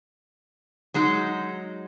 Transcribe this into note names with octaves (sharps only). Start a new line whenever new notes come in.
F#3 G#3 D#4